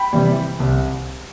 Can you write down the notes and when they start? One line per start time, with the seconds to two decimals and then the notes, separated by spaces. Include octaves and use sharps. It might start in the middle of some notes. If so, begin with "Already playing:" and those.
Already playing: G5 B5
0.13 C3 E3 G3
0.60 C2